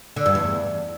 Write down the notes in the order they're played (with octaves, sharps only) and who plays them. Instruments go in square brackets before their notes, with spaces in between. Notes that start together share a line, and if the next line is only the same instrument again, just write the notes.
[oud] D3
G2
E2